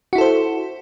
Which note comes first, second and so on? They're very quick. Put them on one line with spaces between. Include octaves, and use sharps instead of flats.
F#4 E4 A4 C5